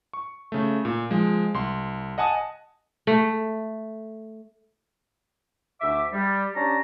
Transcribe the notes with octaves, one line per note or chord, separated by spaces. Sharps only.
C#6
C#3 A3
A#2
F3 G#3
C2 C6
D#5 F#5 G#5 A5 D#6
A3
D2 E5 D6
G3
C#4 D4 G4 A5 A#5